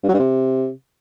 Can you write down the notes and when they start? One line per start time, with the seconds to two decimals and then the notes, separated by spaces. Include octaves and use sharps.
0.03 G2
0.09 F#3
0.14 G2
0.19 C3